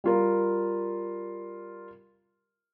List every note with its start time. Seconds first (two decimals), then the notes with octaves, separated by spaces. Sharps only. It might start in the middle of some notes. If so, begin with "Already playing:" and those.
0.04 G3 F4 A#4